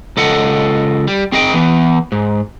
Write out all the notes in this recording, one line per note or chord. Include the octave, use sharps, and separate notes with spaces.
C#2 A4 D#5 F#5
G3
C4 G#4 D#5 G5
E3 B3
G#2